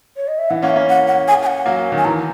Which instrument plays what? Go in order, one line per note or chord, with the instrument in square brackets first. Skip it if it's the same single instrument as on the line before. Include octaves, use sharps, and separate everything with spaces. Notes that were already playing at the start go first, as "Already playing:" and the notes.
[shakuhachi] C#5
D#5
E5
[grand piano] E3 [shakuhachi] F#5
[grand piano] A#3 C#4 [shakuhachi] F#5
[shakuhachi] E5
[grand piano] A#3 C#4
[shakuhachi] F#5
F#5
G#5
G#5
F#5
[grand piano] F#3 A#3
D#3 F#3
[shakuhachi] G#5
[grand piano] E3 [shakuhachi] A#5